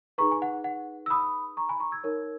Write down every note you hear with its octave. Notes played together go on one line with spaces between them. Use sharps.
D#4 G#4 B4 A#5 C#6
G#5
F#5
F#5
E6
B5 D#6
A#5 C#6
G#5 B5
A#5 C#6
E6 G#6
D#4 A#4 C#5